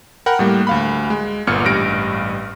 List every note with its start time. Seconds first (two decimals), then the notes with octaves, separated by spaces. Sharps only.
0.26 A#4 F#5 G5 B5 F#6
0.39 A2 G3 A#3
0.67 D2 F5 B5
1.10 G#3
1.47 G1 A#2 B3 F6 C#7
1.64 A1 G2 G3 A#6 D7